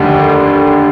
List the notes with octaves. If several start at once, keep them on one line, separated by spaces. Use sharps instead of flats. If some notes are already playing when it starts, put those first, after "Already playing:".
Already playing: F1 D#2 D3 G3